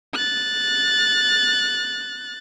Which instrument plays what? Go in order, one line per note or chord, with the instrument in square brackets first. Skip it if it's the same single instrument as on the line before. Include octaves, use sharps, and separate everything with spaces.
[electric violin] F#6 A6